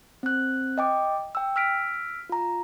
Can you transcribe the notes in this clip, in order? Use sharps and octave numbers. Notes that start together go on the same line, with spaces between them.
C4 F#6
D#5 G5 D6
G5 E6
E6 F6 B6 D7
F4 A#5